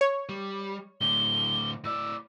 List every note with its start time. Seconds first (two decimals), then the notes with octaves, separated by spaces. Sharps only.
0.01 C#5
0.29 G3
1.01 A2 D3 G7
1.85 A2 D5 E6